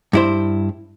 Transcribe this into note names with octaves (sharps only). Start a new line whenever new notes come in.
G2 E4 C5